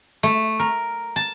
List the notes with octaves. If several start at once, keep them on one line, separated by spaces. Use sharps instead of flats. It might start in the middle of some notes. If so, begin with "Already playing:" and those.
A3
A#4
A5